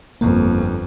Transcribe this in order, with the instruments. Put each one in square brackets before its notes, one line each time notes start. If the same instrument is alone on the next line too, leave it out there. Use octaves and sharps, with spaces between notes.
[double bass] G1 F2 [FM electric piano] A#3